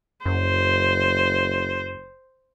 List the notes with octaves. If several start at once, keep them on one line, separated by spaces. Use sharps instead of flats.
F#1 F#2 C5